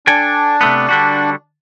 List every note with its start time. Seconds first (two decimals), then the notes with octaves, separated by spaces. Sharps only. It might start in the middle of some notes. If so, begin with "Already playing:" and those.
0.07 D4 A4 G5 G#5
0.61 C3 A3 B3
0.89 D3 G3 F#4